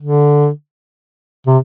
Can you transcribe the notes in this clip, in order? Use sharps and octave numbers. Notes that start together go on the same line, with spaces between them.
D3
C3